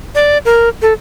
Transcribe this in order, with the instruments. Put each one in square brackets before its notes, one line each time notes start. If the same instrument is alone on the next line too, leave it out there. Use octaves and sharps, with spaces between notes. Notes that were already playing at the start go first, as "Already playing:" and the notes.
[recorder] D5
A#4
A4